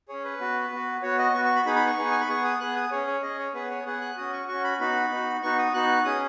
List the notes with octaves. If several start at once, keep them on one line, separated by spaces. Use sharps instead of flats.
C#4 G#4 C#5
B4
B3 F#4
B3 F#4
B3 F#4 C#5
D#5
B3 F#4 C#6
C#6
B5
B3 D#4 G#4 B5
B5
C#6
B3 D#4 G#4
G#5
B5
B3 G#4 C#6
D#6
B3 G#4 F#6
D#6
C#4 G#4 C#5
C#5
C#4 G#4 D#5
C#5
B3 G#4 B4
C#5
B3 G#4 F#5
F#6
C#4 F#4 D#6
C#6
C#4 F#4 C#6
B5
B3 D#4 F#4 B5
B3 D#4 F#4
B3 D#4 F#4 C#6
D#6
B3 D#4 F#4 F#6
C#4 G#4 D#6